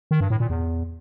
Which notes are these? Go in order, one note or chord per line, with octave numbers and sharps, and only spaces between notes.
D#3
G2
A2
A#2
E2